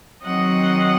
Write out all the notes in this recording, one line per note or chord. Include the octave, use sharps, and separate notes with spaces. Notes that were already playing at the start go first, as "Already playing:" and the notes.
D#3 F#3 C4 D#5 F#5